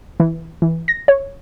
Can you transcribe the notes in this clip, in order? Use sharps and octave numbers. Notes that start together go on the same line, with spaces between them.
E3
E3
A#6
C#5